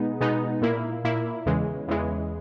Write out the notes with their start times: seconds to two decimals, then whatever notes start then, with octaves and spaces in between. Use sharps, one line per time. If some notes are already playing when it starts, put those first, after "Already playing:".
Already playing: B2 G#3 B3 D#4
0.21 B2 G#3 B3 D#4
0.61 A#2 A#3 E4
1.04 A#2 A#3 E4
1.46 E2 C#3 E3 G#3
1.88 E2 C#3 E3 G#3